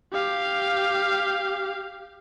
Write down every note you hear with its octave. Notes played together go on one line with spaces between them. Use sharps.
G4 F5